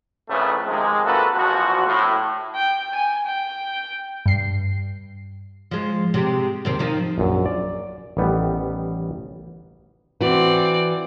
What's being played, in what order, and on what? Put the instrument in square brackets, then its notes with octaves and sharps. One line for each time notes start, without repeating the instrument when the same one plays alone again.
[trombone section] A#1 F2 A2 C#3 A3 B4
C3 D#3 F3 G#3
A#3 C4 F4 F#4 A4 B4
A#1 E2 F3 F#4
A2
[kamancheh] G5
G#5
G5
[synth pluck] G2 C7
[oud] F3 G#3
C3 G#3 G4
D#2 C3 C4
D#3 F3 D#4
[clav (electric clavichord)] A#1 F#2
D5
A1 D#3 G3 B3
[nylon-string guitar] E3 F#4 [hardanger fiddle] C4 D5